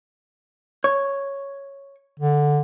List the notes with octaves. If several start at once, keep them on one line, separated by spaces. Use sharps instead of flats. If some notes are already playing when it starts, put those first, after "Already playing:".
C#5
D3